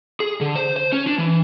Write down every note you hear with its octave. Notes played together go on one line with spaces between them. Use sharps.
G#4
D3
C5
C5
C#4
D4
E3